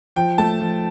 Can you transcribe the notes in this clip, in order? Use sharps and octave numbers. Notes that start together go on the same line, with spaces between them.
F3 G5
A3 A5
F3